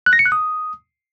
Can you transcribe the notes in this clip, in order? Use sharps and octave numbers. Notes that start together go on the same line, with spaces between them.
F#6
A#6
C#7
F#6
D#6